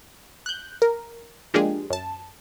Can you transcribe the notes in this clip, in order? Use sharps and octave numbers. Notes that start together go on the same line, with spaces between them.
F#6 G6
A#4
F3 G#3 A#3 D4 G4 G#4
F#2 A5